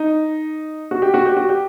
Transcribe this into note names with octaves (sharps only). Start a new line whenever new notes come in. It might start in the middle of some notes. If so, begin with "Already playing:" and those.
Already playing: D#4
F#4
G4
F#4
G4
F#4
G4